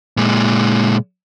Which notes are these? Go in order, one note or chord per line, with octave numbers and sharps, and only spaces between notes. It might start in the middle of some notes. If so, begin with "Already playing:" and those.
A#2 G#3